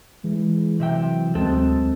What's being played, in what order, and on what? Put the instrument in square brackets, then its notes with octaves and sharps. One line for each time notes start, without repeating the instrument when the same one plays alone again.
[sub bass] E3 [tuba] G#3
[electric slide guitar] C3 E5 G5 [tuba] F#3
[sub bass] D2 [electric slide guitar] G#3 C4 A4